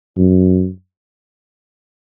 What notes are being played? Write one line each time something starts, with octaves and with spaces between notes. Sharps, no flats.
F#2